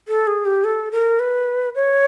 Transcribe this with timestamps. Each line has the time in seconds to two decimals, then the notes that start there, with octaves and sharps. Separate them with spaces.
0.08 A4
0.27 G#4
0.46 G4
0.64 A4
0.92 A#4
1.20 B4
1.75 C#5